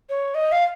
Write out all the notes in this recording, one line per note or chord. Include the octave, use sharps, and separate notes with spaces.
C#5
D#5
F5